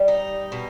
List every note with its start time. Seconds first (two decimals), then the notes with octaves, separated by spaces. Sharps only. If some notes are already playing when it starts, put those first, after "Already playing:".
Already playing: G3
0.08 D#4
0.52 B2